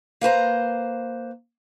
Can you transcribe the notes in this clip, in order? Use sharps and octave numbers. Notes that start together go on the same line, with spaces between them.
A#3 B4 C5 A#5